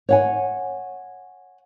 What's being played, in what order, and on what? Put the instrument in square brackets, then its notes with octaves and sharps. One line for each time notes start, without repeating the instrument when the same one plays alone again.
[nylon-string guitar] C#5 F#5 G#5